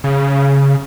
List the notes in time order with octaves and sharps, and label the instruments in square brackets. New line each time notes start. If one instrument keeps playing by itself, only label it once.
[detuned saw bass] C#3